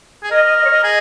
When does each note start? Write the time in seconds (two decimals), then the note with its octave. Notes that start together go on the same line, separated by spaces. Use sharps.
0.23 G#4
0.30 A#4 D#5
0.44 D#5
0.57 D#5
0.65 C#5
0.71 D#5
0.83 G#4